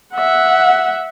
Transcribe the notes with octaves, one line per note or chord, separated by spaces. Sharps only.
E5 F#5